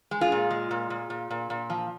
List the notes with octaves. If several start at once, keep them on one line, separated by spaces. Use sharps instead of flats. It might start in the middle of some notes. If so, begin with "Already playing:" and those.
G#3
F4 G#4
A#2
G#3
A#2
A#2
A#2
A#2
A#2
F3